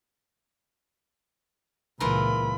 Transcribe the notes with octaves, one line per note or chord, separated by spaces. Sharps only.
C#2 A#2 E3 F4 A#4 B5